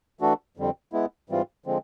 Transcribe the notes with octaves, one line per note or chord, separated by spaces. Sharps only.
E3 A3 D4 F#4 A4
F2 D3 G3 C4
G#3 B3 E4
G#2 E3 G3 C4 F4
D3 F3 G#3 C4